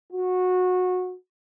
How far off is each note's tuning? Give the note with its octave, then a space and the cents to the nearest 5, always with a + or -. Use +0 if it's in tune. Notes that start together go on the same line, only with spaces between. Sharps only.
F#4 -20